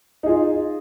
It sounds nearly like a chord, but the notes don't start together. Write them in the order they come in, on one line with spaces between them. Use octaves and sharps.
D#4 G#4 F4